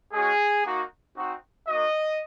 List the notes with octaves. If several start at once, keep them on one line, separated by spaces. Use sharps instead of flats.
G#3 C#4 F#4 G#4
A#3 D#4 F#4
C4 D#4 F#4
A#3 D#4 F#4 D#5